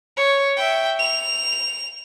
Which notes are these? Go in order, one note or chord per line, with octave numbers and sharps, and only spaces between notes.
C#5
E5 G5
F7